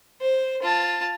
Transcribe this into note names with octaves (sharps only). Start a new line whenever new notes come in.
C5
F4 A5